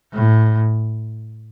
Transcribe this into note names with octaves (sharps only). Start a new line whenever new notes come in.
A2